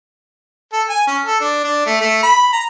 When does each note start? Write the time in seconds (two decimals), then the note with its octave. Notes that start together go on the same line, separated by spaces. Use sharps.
0.73 A4
0.89 G#5
1.07 C#4
1.25 A4
1.41 D4
1.64 D4
1.86 A3
2.01 A3
2.22 B5
2.53 A#5